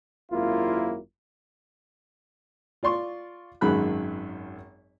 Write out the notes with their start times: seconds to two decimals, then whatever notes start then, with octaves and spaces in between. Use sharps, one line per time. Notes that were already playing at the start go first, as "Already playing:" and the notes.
0.32 G#1 F#2 A#3 E4 F4
2.83 F4 D5 C6 C#6
3.61 G#1 F#2 D#3 G#4 B5 F#6